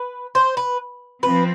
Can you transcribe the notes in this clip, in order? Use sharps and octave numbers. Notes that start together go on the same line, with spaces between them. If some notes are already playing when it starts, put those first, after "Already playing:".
Already playing: B4
C5
B4
F3 C4 B4